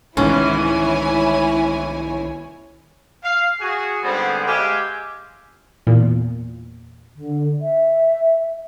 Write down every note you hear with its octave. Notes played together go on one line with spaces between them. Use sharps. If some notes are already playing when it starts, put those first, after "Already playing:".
C2 G#2 D#3 E3 C#4 E4 C#5 G#5
F5
F#4 G#4
G#2 D3 G3 B3 C4 G#4
G#3 G4 E5 F5 G5 G#5
E2 A#2
D3
E5